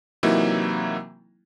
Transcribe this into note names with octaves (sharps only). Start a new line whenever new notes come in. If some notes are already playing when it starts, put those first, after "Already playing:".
C3 E3 F#3 A#3 D#4 E4